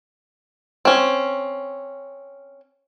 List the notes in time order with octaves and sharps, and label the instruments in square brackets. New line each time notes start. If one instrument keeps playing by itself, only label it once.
[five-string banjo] C4 C#4